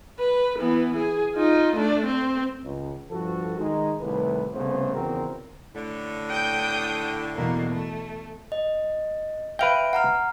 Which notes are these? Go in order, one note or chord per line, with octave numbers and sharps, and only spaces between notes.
B4
E3 B3
G#4
D#4 F4
A3 D4
C4
C#2
G2 F3 F#4 A4
D#3 G#3 D#4
C2 A2 D#3 B4
C2 A2 C#3 A3 B3 C5
G#1 E2 C#3 C4 F#4 A#4
A2 D3
G5 D#6 G6
E2 B2 A#3
A3
D#5
B4 E5 F5 G5 D7
F#5 A#5 F6